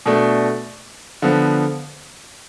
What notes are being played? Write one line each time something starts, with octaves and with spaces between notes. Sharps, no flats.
B2 A3 D4
D3 F3 B3